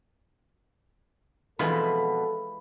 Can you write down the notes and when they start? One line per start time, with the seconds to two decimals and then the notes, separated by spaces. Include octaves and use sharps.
1.59 F2 B2 E3 G#3 F4 A4 B5